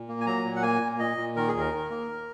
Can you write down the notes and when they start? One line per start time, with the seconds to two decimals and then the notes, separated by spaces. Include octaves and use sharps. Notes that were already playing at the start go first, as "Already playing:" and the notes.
Already playing: A#2
0.08 A#3
0.21 G#5
0.26 F#3 A#5
0.44 A#2
0.56 F#5
0.62 A#3 G#5
0.81 A#2
0.99 A#2 D#5
1.17 A#2
1.36 D#3 A#4
1.48 G#4
1.54 D#2
1.60 A#4
1.72 D#3
1.90 A#3